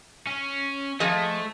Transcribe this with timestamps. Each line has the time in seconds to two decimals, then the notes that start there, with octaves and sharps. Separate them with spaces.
0.27 C#4
1.00 F3 A3 G#4 D#5